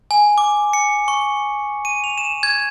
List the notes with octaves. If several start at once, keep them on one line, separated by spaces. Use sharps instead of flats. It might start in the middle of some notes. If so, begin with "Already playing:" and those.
G#5
D6
C#7
C#6
D#7
F7
E7
G#6